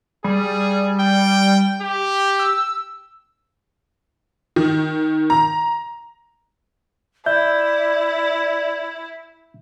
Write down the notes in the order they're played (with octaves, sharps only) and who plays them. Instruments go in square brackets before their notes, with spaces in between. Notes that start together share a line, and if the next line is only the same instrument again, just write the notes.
[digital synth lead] G3 [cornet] G#4
[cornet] G5
G4
[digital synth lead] E6
[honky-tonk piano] D#3
A#5
[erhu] E4 [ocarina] D5 [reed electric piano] E5 G6